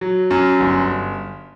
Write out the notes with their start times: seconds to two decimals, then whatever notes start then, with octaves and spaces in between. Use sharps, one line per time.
0.01 F#3
0.31 F#2
0.60 G1